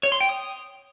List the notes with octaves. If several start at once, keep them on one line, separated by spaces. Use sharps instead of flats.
C#5
C6
G5
D#6